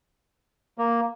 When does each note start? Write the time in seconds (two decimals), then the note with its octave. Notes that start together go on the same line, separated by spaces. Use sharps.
0.78 A#3